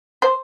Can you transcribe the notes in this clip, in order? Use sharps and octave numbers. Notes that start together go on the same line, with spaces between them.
C5